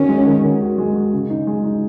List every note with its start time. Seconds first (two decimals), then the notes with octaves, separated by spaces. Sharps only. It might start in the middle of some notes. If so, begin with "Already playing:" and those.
Already playing: D#3 C#4 F#4
0.09 G#3
0.27 D#3
0.44 D#3
0.61 F#4
0.78 G#3
0.96 F#4
1.13 C#3
1.30 D#4
1.47 G#3
1.64 D#4